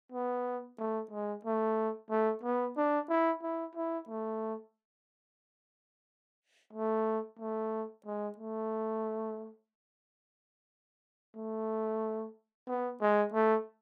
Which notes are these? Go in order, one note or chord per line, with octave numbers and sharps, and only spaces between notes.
B3
A3
G#3
A3
A3
B3
D4
E4
E4
E4
A3
A3
A3
G#3
A3
A3
B3
G#3
A3